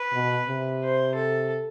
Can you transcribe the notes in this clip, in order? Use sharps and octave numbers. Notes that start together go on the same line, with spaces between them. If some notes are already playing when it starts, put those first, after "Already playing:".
Already playing: B4
B2
C3
C5
A4